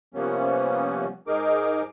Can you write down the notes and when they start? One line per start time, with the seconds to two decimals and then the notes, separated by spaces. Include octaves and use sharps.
0.14 C3 F3 G3 A#3 B3 C#4
1.27 G#2 D#4 G#4 A#4 D6